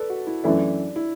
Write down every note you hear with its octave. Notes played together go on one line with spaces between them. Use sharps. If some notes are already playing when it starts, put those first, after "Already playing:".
Already playing: A4 B4 D5
F#4
E4
F#2 E3 A3 D4 E4
E4